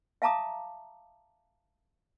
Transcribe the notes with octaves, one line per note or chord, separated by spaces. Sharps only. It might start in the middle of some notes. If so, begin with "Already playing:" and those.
E5 F5 A5 A#5 D6 D#6